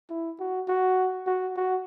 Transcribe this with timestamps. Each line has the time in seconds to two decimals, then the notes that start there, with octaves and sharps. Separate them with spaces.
0.10 E4
0.40 F#4
0.68 F#4
1.27 F#4
1.57 F#4